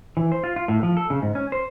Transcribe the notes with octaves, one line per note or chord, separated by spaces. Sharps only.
E3
C5
F4
F4
A2
F3
A4
C#3
G#2
C#4
C5